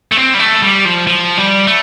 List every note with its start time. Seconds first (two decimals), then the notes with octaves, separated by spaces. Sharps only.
0.12 A3
0.17 C4
0.34 G3
0.39 A3
0.62 G3
0.85 F3
1.07 F3
1.38 G3
1.67 A3